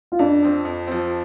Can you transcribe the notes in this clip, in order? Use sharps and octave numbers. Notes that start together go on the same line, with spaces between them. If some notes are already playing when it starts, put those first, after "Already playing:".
F4
F2 D4
F3 C4
F2
F3 C4